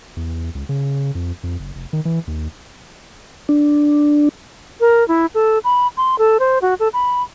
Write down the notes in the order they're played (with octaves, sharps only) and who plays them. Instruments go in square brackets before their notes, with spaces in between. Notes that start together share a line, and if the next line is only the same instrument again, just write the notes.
[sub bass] E2
C#2
C#3
F2
F2
F#1
F1
D#3
E3
D#2
[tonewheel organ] D4
[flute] A#4
E4
A4
B5
C6
A4
C5
F#4
A4
B5